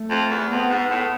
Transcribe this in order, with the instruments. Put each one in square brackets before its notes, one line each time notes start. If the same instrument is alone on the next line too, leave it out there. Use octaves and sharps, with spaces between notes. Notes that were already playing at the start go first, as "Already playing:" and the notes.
Already playing: [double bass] A3
[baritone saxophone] F2
E2
[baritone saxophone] F2 [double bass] B3
[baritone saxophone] G#2
A2